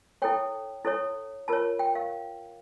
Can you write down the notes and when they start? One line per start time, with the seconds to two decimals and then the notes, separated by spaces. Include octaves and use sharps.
0.22 E4 A4 C#5 G5
0.85 E4 A4 C#5
1.48 F4 A#4 C#5 A5
1.79 G5
1.95 F5